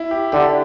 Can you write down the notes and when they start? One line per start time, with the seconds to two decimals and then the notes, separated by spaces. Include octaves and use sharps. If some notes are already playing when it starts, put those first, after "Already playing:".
Already playing: E4
0.11 G4
0.32 D3 G4